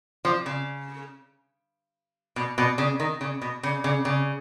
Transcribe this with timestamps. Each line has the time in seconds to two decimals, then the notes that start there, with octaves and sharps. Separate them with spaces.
0.25 F3
0.46 C#3
2.36 B2
2.58 B2
2.78 C#3
3.00 D#3
3.21 C#3
3.42 B2
3.63 C#3
3.84 C#3
4.05 C#3